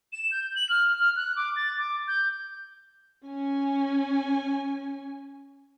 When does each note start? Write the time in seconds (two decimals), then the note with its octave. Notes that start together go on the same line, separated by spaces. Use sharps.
0.13 E7
0.31 G6
0.56 F#7
0.69 F6
0.99 F6
1.16 F#6
1.36 D6
1.56 A6
1.77 D6
2.08 G6
3.26 C#4 G#5